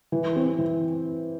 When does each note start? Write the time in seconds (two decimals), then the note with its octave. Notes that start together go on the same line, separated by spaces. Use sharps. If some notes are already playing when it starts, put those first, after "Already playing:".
0.12 E3
0.36 C4
0.58 E3